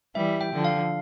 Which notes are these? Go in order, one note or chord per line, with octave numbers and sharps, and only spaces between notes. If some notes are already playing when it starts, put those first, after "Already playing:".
E3 G3 E5
G5
D3 F3
F5